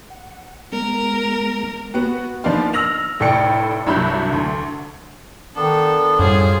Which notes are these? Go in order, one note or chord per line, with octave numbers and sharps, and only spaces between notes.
F#5
G#3 B3 A#4
B3 F#4
F3 A#3 B3 D4 D#4 F4
E6 F6 A#6 F7 F#7
F1 A2 D5 G5 C#7
C2 G2 F#3 E4 B5 G6
D2
D#3 B3 D4 A4
F#2 A2 G3 F4 G#4 C5